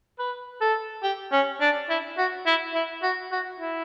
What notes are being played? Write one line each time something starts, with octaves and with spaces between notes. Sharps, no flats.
B4
A4
G4
C#4
D4
E4
F#4
E4
E4
F#4
F#4
E4